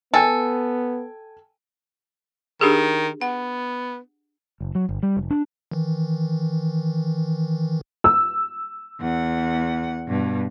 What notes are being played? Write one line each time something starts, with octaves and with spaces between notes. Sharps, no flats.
B3 A4 G5 G#5
D#3 D4 G4 G#4
B3 F#5
F#1
F#3
G1
G3
F1
D4
D#3 E3
E6
E2 F#5
G2 B2